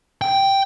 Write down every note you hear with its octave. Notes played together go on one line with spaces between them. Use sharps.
G5